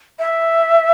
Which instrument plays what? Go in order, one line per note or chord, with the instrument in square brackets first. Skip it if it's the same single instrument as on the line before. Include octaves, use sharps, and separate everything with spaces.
[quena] E5